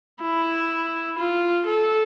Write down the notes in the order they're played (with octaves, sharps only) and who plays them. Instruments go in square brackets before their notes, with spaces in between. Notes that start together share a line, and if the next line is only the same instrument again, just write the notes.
[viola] E4
F4
A4